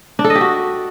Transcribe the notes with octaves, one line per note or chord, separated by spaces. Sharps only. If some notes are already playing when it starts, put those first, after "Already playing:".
D4
A4
D#5
G4
F#4